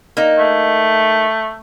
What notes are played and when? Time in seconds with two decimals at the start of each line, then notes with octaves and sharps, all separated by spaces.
0.17 A#3 D#4
0.39 A3